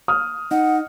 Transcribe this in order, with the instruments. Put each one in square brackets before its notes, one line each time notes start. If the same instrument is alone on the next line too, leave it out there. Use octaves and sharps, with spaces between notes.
[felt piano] D#6 F6
[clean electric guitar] D#4 [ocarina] F#5